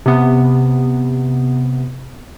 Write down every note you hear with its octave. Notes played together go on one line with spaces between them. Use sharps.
C3 B3